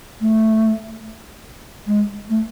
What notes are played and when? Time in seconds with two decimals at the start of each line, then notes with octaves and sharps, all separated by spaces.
0.20 A3
1.86 G#3
2.29 A3